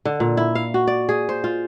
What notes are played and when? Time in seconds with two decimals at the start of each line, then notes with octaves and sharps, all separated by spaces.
0.05 D3
0.20 A#2
0.37 E4
0.55 F5
0.74 F#4
0.87 D5
1.09 G#4
1.29 C5
1.44 F4